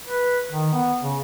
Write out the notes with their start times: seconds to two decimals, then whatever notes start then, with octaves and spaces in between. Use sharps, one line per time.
0.07 B4
0.49 D#3
0.73 B3
1.02 C#3